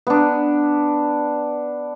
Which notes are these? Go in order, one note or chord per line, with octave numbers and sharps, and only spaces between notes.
B3 D4